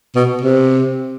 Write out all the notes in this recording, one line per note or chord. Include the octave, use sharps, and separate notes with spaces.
B2
C3